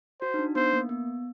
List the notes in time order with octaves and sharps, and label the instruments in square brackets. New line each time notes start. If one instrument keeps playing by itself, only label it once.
[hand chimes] F#4 [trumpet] C5
[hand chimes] D#4
D4
[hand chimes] B3 [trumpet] C5
[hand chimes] A#3
B3